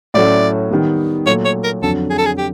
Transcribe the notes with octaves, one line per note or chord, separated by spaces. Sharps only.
A2 F#3 A3 C#4 F#4 D5
D#3 G3 B3
A#2 F#3 A3 C#5
C#5
A#4
F2 D3 F#3 A4
G#4
A4
G#4
G4